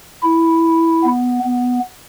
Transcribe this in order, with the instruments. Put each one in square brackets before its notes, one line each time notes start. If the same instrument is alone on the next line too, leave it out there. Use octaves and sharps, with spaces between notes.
[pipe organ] E4
B3
B3